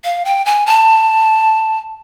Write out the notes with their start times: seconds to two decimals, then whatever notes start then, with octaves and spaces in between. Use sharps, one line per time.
0.04 F5
0.25 G5
0.46 G#5
0.66 A5